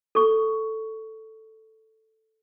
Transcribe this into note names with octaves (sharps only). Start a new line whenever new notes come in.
A4 C#6